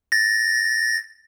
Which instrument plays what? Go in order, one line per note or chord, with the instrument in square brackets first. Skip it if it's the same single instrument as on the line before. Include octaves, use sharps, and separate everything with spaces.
[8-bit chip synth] A6 A#6